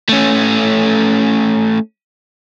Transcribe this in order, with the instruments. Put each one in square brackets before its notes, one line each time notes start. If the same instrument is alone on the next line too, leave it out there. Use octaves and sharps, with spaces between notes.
[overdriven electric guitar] A3 C#4